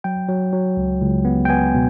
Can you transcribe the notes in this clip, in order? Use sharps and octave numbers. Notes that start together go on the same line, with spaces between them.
F#3 G5
F#3
F#3
C#2
C#2
B3
G5
B3 G#5
B2